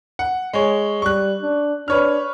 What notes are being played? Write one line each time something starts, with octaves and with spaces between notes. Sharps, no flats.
F#5
G#3 C#5
G3 C#6 F#6
D4
D4 B4 C#5 F6